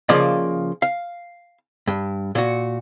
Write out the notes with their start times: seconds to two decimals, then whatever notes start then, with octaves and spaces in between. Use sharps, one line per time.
0.09 C#3 F3 A#3 D5 D#5
0.82 F5
1.87 G2
2.35 A#2 F#4